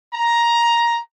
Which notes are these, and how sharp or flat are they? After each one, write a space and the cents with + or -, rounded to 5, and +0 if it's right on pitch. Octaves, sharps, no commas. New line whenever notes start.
A#5 +10